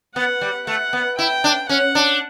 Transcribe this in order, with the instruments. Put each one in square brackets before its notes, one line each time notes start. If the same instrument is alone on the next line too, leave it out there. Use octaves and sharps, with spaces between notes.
[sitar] B3 [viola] F#5
[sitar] G3
[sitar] A3 [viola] F#5
[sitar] B3
[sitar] E4 [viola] G5
[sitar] D4
[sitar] C#4 [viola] F#5
[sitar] D4